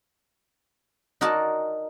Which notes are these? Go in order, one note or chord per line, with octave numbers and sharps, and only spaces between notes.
D#4 F#4 A#4 D5 A5